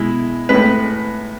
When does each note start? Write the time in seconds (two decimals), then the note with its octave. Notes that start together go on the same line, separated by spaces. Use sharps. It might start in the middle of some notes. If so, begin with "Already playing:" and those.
Already playing: B2 G#3 E4
0.49 A2 G#3 B4